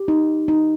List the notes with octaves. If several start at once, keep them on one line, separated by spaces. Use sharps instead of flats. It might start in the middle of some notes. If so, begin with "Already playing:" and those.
Already playing: G4
D#4
D#4